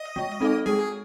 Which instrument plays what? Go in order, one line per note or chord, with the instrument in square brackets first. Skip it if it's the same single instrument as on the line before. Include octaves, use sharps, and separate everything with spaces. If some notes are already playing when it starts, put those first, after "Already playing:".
Already playing: [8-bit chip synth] D#5
[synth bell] G#3
C4 D#4 A4
[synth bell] G#3 [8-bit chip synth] G#4